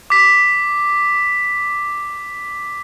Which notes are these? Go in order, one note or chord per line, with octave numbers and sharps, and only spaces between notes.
D6 B6